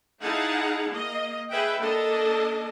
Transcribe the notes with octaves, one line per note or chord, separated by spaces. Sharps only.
D#4 E4 G#4 F5 F#5 A5
A#3 D#5
G#4 B4 D#5 E5 F#5 G5
A#3 D4 A4 D#5 A5